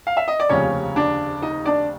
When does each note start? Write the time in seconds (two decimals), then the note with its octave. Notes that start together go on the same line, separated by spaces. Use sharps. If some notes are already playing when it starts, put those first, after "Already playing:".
0.07 F5
0.17 E5
0.28 D#5
0.40 D5
0.49 F1 D#2 C#3 F3 C#4 C#5
0.96 D4 D5
1.42 D#4 D#5
1.66 D4 D5